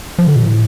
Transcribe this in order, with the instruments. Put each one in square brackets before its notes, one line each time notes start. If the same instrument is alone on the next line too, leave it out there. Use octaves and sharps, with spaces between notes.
[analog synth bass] F3
D3
A#2
A2